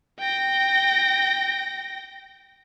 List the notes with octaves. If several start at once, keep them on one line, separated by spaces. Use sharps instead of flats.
G5 A#6